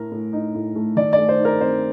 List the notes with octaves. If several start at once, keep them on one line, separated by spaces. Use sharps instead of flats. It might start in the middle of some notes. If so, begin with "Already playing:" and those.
Already playing: A2 A3 A#4
A2
D#4
A2
A3
D#3 D5
D5
A3
C5
D#4
A#4
C4 C5